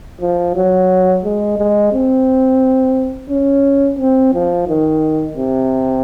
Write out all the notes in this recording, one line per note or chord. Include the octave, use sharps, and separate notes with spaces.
F3
F#3
G#3
G#3
C4
C#4
C4
F3
D#3
C3